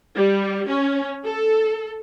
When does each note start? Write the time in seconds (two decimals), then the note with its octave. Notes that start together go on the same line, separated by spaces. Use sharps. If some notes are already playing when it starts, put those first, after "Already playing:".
0.16 G3
0.67 C#4
1.24 A4